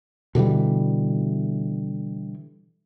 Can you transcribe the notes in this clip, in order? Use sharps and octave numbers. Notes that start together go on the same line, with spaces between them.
B2 D3 E3 G3